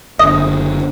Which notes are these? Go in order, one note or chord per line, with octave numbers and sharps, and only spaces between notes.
F#1 D3 D#5